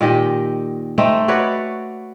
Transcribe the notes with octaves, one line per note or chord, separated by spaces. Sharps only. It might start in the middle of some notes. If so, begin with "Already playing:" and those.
A#2 D#3 G4 D#5
A3 C4 D#4 A4
F#4 B4 C#5 D5